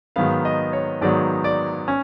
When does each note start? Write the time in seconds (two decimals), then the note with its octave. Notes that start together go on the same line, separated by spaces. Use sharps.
0.16 G#2 D#3 F#3 B3 F5
0.45 D#5
0.73 C#5
1.01 G#2 D#3 F#3 B3 D5
1.44 D5
1.88 C#4